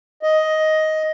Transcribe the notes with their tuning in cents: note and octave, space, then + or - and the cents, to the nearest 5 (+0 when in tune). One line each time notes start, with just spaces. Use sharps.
D#5 +10